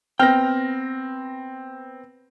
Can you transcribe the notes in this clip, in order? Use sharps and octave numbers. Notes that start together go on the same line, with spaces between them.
B3 C4 G5 F6 A#6